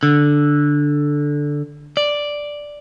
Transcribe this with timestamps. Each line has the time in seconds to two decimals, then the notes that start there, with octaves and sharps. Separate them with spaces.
0.03 D3
1.97 D5